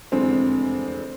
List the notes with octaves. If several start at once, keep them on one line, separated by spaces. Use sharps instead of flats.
F1 E2 D3 G#3 C4 C5